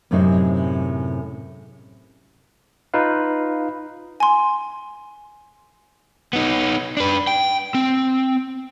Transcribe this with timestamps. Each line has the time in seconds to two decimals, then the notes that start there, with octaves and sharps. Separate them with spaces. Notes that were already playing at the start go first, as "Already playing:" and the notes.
0.11 F#2 A2 C3 G#3 C4 D#4
2.94 D#4 F4 B4 F5
4.20 G#5 C6
6.33 B3 D#4
6.97 D4 B4
7.27 G5
7.75 C4